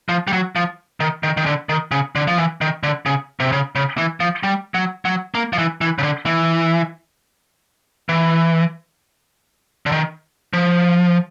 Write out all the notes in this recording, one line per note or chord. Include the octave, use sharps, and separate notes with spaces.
F3
G3
F#3
F3
D#3
D#3
D#3
D3
D#3
C#3
D3
F3
E3
D#3
D3
C#3
C3
C#3
C#3
E3
F3
G3
F#3
F#3
A#3
F3
E3
E3
C#3
D3
E3
E3
D3
D#3
F3